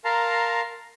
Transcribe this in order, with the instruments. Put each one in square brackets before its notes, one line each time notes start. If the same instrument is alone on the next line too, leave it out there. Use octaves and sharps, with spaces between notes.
[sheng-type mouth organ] A#4 F5 A5 A#5 C6